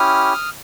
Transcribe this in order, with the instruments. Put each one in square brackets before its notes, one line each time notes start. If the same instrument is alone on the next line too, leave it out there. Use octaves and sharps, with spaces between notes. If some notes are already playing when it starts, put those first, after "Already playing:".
Already playing: [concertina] C#4 E4 G4 D#6 F6